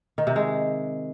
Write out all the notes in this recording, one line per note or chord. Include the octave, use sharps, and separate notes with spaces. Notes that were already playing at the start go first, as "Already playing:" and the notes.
D#3
C3
G#3